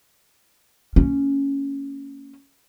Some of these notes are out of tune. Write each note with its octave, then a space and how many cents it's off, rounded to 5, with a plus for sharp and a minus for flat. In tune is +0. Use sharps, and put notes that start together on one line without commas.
A#3 -30 C#4 +0